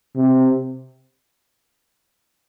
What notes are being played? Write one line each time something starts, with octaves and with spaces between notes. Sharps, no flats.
C3